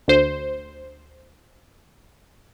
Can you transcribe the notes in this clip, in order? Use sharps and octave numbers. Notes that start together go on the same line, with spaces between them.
D2 C5